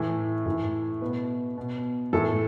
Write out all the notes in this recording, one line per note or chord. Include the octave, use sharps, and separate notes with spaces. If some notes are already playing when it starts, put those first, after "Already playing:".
Already playing: A2 E3
A2 E3
B2 B4
B2
A2 E3 A4